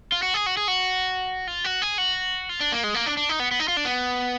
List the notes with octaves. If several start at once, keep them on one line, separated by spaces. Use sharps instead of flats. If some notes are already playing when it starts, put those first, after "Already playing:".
F4
F#4
G#4
F#4
G#4
F#4
F4
F#4
G#4
F#4
F4
D4
A#3
G#3
A#3
D4
D4
D#4
B3
B3
D#4
F4
D4
B3